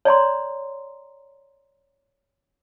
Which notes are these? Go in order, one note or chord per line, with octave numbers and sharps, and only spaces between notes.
C#5 D5 A#5 C6